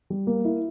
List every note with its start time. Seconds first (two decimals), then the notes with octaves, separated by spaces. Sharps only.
0.10 G3
0.27 A#3
0.45 E4